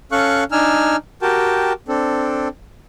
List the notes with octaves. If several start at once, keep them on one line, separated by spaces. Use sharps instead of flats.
C#4 A4 F5 C#6 F#6
D4 D#4 G#5 E6 F6
F#4 G4 A#4 G5 A5
C4 D4 A4